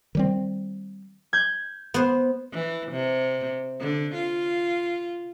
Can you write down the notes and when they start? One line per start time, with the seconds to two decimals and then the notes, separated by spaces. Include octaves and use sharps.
0.15 D#3 G3 C4
1.33 G6 G#6
1.94 B3 C5
2.52 E3
2.92 C3
3.80 D3
4.14 F4